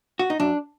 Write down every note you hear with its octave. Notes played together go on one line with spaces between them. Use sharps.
F#4
D#4
F#2 D4